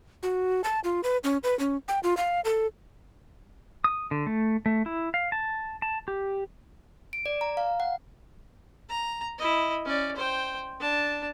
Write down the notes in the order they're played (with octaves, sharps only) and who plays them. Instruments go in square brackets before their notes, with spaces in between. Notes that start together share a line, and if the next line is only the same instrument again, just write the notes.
[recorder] F#4
A5
F4
B4
C#4
B4
C#4
G5
F4
F5
A4
[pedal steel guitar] D#6
D3
A3
A3
E4
F5
A5
A5
G4
[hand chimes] D7
D5
A#5
F5
F#5
[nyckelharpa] A#5
E4 D#5
C#4 D5
C5 G5
D4 A5